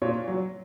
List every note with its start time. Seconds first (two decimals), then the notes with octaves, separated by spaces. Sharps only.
0.02 A#2 C#5
0.28 F#3